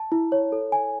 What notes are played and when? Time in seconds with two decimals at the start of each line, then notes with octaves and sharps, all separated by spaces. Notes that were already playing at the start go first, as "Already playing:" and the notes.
Already playing: A5
0.12 E4
0.32 C#5
0.52 A4
0.72 G#5